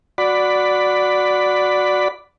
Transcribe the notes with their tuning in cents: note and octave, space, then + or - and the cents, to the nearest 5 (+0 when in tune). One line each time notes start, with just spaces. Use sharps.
F#4 -10 D5 +0 B5 +10